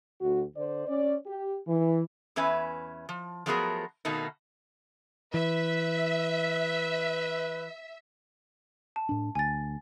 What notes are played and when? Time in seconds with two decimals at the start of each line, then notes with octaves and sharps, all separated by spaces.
0.21 D2 F#4
0.56 D3 C5 D5
0.88 C#4 D5
1.27 G4
1.67 E3
2.36 E2 C#4 B4 E5 G#5
3.09 F3
3.46 F3 F#3 A3 B3 G#4 A#4
4.05 B2 D#3 A3 A#3 D#4
5.34 E3 B4 E5
8.96 A5
9.09 A2 D4
9.35 D2 G#5 A6